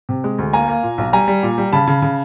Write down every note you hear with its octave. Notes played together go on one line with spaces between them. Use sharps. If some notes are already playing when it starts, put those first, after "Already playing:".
C3
G#3
D2
A#3 G#5 A#5
A#3
A#2
B1
G3 G#5 A#5
G3
A#2
G3
C#3 A5 B5
C#3
C#3